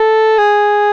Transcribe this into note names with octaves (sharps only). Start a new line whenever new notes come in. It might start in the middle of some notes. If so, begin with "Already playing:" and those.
Already playing: A4
G#4